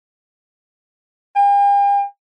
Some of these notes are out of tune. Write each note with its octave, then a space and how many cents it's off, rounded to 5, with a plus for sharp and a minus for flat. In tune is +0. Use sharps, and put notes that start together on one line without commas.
G5 +45